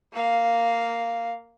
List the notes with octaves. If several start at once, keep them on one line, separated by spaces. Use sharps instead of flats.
A#3 F5